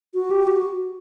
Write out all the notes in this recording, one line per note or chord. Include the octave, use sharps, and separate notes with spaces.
F#4
G4
F#4